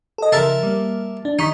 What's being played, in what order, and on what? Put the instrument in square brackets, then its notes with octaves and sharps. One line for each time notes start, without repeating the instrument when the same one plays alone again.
[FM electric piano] A4 D#5
[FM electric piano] C#3 F3 [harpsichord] A#4 E5 A5
[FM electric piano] G3 A#3
D4
[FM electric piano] D#3 C#6 B6 [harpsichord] D#4